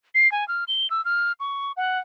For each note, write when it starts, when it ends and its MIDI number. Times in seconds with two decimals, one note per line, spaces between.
0.15 0.30 96
0.32 0.46 80
0.48 0.64 89
0.68 0.89 103
0.90 1.04 88
1.05 1.32 89
1.40 1.72 85
1.77 2.00 78